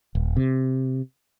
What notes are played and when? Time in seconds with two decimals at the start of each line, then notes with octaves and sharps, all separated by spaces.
0.15 D#1
0.37 C3